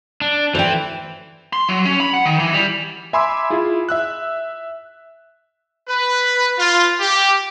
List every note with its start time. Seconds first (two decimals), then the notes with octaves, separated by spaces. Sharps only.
0.21 D4
0.55 E3 C5 G5
1.53 C6
1.69 F#3
1.85 C#4
2.00 B5
2.14 F#5
2.26 D#3
2.39 E3
2.53 G3
3.13 E5 G#5 B5 C6 D6 E6
3.50 E4 F4 G#4
3.89 E5 E6 F#6
5.88 B4
6.57 F4
7.00 G4